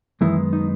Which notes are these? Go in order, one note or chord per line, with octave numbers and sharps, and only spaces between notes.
F#2 D#3 E3 G#3 B3 E4
D#4